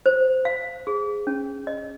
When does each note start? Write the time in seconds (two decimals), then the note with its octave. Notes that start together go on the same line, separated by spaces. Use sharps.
0.06 C5
0.45 F5
0.87 G#4
1.27 C#4
1.67 D#5